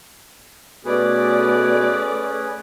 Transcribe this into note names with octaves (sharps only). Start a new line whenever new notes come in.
B2 A3 C#4 G#4 B4 D5